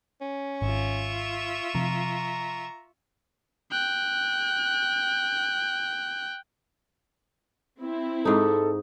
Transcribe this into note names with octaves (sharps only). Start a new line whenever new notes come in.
C#4
G#1 F4 E5 C#6
C3 F3 A#5
G5 F#6
C4 E4
G#2 D#4 A4